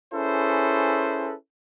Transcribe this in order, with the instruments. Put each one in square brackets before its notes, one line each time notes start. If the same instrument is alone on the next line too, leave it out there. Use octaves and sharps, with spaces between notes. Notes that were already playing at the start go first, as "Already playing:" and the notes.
[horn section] C#4 E4 G#4 A4 B4 C5